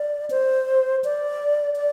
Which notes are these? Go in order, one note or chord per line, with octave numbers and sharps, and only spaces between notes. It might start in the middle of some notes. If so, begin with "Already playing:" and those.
Already playing: D5
C5
D5
D5